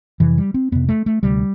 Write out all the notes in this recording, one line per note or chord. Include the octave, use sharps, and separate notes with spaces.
F2 C3 E3
G3
C4
F2 C3 B3
A3
A3
D2 C3 G3